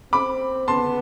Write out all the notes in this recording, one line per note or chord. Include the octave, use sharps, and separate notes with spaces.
C4 B5 D6
B3 A5 C6